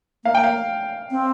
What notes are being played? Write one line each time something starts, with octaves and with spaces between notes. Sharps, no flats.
A#3 F5
G5
F5
C4